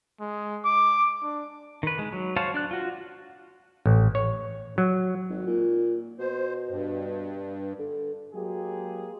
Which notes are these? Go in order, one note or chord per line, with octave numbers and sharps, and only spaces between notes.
G#3
D6
D4
D#3 B4
G#3
F#3
F#4 C5 C#5 F5 A5
D4 D5 F#6
F4 F#4
A1
C#5
F#3
G#1
A#2
B2 C5
G2
D3
F#3 G#3 A#3 G4 G#4